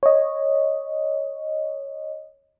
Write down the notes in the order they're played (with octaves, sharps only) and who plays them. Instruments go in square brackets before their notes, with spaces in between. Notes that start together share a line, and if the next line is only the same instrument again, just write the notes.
[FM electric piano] C#5 D#5